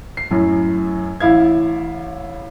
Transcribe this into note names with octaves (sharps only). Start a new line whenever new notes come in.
C7
F#2 A2
A1 E4 F5 G#6